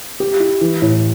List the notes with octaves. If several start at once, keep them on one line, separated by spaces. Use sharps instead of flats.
G4
E4
E3
A2